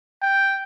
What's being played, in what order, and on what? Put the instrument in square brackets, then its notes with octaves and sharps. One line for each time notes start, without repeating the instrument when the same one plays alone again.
[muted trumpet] G5